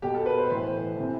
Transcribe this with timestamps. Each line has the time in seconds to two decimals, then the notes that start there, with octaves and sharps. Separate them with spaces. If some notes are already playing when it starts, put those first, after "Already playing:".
0.02 B2 G4
0.14 A4
0.26 B4
0.38 C5
0.50 A2 E3 C5
0.97 C3 E3